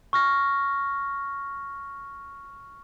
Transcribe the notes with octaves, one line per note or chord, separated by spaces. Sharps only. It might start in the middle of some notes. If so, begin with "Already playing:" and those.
C#6 F6 A#6